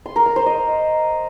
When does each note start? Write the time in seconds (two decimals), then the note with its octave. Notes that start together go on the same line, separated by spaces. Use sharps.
0.06 C6
0.16 A#4
0.26 A#5
0.36 C5
0.46 D#5